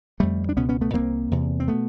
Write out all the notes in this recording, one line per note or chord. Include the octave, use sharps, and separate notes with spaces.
F2 D3 G3 A3
D4
C#2 B2 B3 C#4
B3 C#4
A3 B3
C2 A#2 A#3 C4
E2 C3
C4
B2 A3 B3